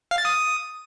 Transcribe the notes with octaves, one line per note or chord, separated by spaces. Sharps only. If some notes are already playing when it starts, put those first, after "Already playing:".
F5
A6
D#6